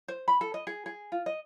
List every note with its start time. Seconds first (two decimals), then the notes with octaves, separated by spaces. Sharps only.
0.08 C5
0.28 B5
0.41 A4
0.54 D#5
0.67 G#4
0.86 G#4
1.12 F4
1.26 D#5